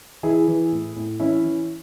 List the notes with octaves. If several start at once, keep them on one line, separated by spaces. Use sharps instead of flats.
E3 E4 G#4
E3
A2
A2
E3 C#4 E4
E3